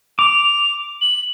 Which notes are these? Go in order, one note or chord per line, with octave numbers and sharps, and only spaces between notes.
D6 F7
F#7